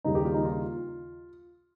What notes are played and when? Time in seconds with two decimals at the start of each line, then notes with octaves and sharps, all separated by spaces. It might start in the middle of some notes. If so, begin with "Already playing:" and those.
0.04 D#2 C#3 G3 D#4
0.15 G4
0.25 F4
0.34 D#4
0.45 F4